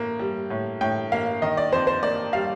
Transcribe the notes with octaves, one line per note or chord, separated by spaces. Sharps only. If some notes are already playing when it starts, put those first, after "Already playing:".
Already playing: A2 A#3
G3
A2
A2 G5
A#3 F5
D#3 D#5
D5
F2 C5
C5
A#3 D5
G3 F5